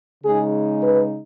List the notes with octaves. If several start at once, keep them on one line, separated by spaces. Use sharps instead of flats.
C#3 G#3 D#4 G#4
B4